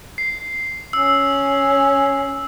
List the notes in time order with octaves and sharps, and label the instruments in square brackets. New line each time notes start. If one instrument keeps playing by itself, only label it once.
[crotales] C7
[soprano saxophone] C#4 [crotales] E6